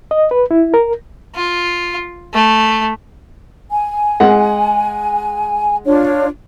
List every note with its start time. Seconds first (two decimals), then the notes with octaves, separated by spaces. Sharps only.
0.11 D#5
0.31 B4
0.51 E4
0.74 A#4
1.35 F4
2.33 A3
3.71 G#5
4.20 G#3 F#5
5.85 D4 F4 C#5